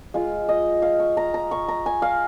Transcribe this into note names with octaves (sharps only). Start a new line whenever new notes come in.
G#3 F4 F5
D#5
F5
C#6
A#5
A#5
C#6
A#5
G#5
F5